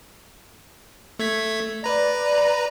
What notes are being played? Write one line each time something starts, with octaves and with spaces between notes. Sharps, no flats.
A3 G#6 B6
B4 D5 A#5